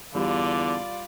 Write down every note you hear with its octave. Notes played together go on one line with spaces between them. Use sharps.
E2 D3 G3 F4 D5